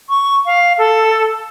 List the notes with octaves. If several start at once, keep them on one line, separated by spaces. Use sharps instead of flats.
C#6
F5
A4